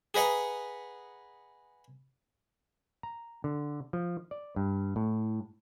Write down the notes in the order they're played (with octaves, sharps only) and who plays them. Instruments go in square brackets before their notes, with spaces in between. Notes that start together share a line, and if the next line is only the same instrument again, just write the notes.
[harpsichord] G#4 B4 D#5 F#5 A#5
[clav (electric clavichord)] A#5
D3
F3
D5
G2
A2